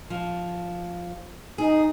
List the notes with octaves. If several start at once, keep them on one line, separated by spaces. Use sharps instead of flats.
F3
D#4 G#4